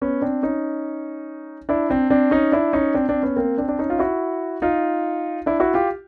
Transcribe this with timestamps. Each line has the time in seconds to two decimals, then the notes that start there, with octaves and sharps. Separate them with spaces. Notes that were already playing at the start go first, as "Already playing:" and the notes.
0.02 B3 C#4
0.22 C4 D4
0.43 C#4 D#4
1.69 D4 E4
1.90 C4 D4
2.10 C4 D4
2.31 C#4 D#4
2.52 D4 E4
2.73 C#4 D#4
2.94 C4 D4
3.09 C4 D4
3.23 B3 C#4
3.36 A#3 C4
3.58 C4 D4
3.68 D4
3.79 C#4 D#4
3.90 F4
3.99 E4 F#4
4.62 D#4 F4
5.46 D4 E4
5.60 E4 F#4
5.74 F4 G4